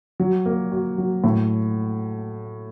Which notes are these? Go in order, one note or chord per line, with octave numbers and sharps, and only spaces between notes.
F#3
A#3
F#4
F#3
A2